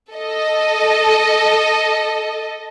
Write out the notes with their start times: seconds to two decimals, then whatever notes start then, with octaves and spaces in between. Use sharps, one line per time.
0.11 A4 D#5